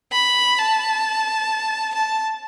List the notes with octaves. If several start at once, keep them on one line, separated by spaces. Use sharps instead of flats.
B5
A5
A5